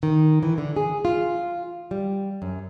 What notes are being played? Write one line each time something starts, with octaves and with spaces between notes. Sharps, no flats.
D#3
E3
D3
G#4
F4
G3
F#2